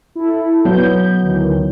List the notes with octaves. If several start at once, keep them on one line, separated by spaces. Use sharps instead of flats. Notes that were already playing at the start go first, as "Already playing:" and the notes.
E4 A4
F#3 B3 G6
D2 D#3 E3